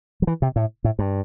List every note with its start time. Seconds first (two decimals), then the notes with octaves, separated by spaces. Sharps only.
0.22 F#3
0.27 E3
0.42 C3
0.56 A2
0.84 A2
0.99 G2